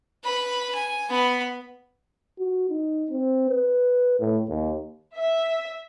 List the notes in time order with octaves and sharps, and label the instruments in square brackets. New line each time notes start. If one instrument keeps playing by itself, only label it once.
[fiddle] B4 B5
G#5
B3 B5
[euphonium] F#4
D#4
C4
B4
A2
D#2
[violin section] E5